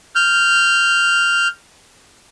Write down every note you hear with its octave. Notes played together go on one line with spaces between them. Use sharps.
F6 G6